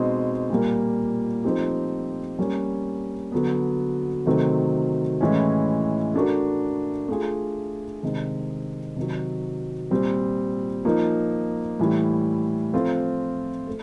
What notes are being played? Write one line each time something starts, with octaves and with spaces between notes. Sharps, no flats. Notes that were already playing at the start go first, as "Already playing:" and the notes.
Already playing: B2 G#3 C4 D#4
A#2 G3 A#3
F3 A3 C4 D#4 G4
G3 A#3 C#4
D3 F#3 B3
C3 D#3 F#3 A3 C4
A2 E3 G#3 C#4
A3 D4 F#4 A#4
A3 D4 F4 G#4
C3 D#3 G#3
C3 D#3 F#3
A#2 G3 C4
F3 A#3 D#4
A2 E3 G3
F3 A3 C4 F4
A3